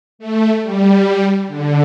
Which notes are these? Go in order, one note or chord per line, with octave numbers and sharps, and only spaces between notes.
A3
G3
D3